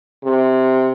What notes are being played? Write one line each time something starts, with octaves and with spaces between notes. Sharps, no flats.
C3